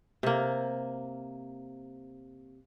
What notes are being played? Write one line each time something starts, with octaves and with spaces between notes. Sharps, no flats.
C3 A#3